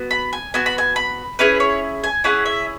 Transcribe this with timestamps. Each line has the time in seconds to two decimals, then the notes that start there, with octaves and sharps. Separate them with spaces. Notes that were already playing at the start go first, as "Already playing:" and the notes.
Already playing: B3 F#4
0.11 B5
0.33 G#5
0.54 B3 F#4 G#5
0.66 B5
0.78 G#5
0.96 B5
1.39 C#4 E4 G#4 B4
1.60 C#5
2.04 G#5
2.24 C#4 E4 G#4 F#5
2.46 E5